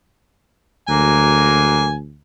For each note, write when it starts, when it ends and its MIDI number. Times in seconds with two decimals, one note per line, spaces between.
0.89 2.21 38
0.89 1.86 54
0.89 1.86 56
0.89 1.86 58
0.89 1.93 80